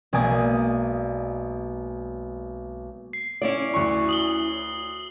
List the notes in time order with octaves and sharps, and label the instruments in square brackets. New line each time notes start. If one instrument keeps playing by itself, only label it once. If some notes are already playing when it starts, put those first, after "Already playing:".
[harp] B1 G#3 A#3 D5 G#5 D#6
[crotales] C7
[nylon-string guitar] C#4 E4 D5
[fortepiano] D2 C#6
[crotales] D#6 F#7 G7